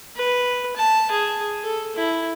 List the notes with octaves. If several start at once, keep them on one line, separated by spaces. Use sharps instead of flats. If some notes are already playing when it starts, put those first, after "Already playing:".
B4
A5
G#4
A4
E4